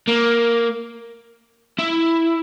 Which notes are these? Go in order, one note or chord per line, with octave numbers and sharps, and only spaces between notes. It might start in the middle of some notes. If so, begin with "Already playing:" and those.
A#3
E4